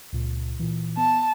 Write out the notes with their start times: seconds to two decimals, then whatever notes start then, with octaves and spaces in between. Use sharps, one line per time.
0.13 C#2 A#2
0.60 A#2 E3
0.97 B3 A5